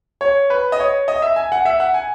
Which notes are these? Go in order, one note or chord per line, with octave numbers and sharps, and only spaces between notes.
C#5
B4
D#5
C#5
D#5
E5
G#5
F#5
E5
F#5
G#5